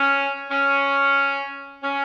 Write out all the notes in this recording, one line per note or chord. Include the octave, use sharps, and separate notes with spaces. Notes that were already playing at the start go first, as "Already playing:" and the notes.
Already playing: C#4
C#4
C#4